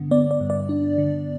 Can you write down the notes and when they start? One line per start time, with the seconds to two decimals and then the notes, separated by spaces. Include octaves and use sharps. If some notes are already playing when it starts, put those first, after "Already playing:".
Already playing: G2 D3 B3
0.11 B3 D5
0.31 D5
0.40 G2
0.50 D5
0.69 D4
0.98 D3